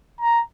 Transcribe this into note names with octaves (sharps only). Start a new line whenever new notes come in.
A#5